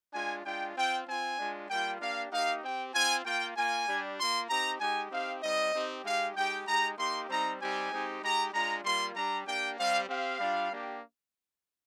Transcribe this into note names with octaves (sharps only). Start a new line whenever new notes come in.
G#3 D4 F4 G#5
G#3 D4 F4 G5
C4 F4 G5
C4 F4 G#5
G#3 D4 F4
G3 A#3 F4 G5
A#3 D4 G4 F5
A#3 D#4 G4 F5
C4 G4 G5
C4 F4 G#5
A#3 F4 G5
A#3 F4 G#5
G3 D4 G4
A#3 F4 C6
C4 D#4 G4 A#5
G#3 D#4 G4 G#5
C4 D#4 G4 F5
G3 C4 D#4 D#5
C4 D#4 G4
G#3 D#4 G4 F5
G#3 D#4 G4 G5
G#3 D#4 G4 A#5
A#3 D#4 G4 C6
G3 C4 D#4 A#5
G3 C4 D#4 G4 G#5
G#3 C4 D#4 G4
G#3 D#4 G4 A#5
G#3 D4 F4 A#5
G3 A#3 F4 C6
G3 D4 G4 A#5
A#3 D4 G4 G5
G3 C4 G4 F5
C4 G4 F5
G3 D4 F4
A#3 D4 G4